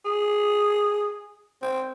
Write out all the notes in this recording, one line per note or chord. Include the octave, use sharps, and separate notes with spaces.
G#4
C4